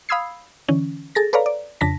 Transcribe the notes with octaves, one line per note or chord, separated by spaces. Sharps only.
F5 B5 D#6 E6 G#6 C7
D3 E3 C#4
G#4 A4 A6 A#6
A4 B4 C#5 D5 F5 A#5
D5
F2 C#3 D4 A5 A#6 B6